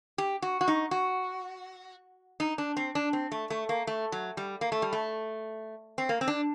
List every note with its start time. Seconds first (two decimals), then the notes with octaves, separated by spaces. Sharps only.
0.18 G4
0.42 F#4
0.61 F#4
0.68 D#4
0.91 F#4
2.40 D#4
2.58 D4
2.77 C4
2.95 D4
3.13 C4
3.32 A3
3.50 A3
3.69 A#3
3.87 A3
4.12 F#3
4.37 G3
4.61 A#3
4.72 A3
4.82 G3
4.93 A3
5.98 C4
6.09 A#3
6.21 C4
6.28 D4